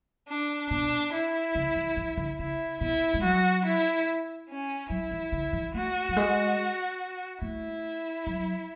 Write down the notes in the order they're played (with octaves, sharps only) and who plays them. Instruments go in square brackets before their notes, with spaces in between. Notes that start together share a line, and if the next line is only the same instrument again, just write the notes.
[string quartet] D4
[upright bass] B2 [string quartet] D4
[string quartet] E4
[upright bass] C#3
E3
E3
D3
[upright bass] C#3 [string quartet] E4
[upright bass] B2 [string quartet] E4
[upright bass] G#3
[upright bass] F#3 [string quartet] F#4
[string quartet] E4
C#4
[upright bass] F#3 [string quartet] E4
[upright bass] E3
D3
E3
[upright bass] A3 [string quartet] F#4
[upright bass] F#3
G#3
[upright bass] A3 [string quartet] E4
[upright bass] F#3